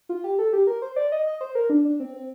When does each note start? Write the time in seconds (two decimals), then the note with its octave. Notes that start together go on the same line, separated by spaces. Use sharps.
0.09 F4
0.24 G4
0.39 A4
0.53 G4
0.67 A#4
0.82 C5
0.96 D5
1.12 D#5
1.27 D#5
1.41 C5
1.55 A#4
1.70 D4
1.85 D4
2.00 C4
2.14 C4